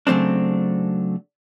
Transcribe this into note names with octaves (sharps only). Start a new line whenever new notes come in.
C#3 F#3 A3 C4 D4